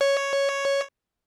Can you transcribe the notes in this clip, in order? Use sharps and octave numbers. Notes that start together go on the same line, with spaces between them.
C#5